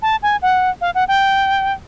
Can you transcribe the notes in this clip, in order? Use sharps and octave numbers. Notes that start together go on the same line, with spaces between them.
A5
G#5
F#5
F5
F#5
G5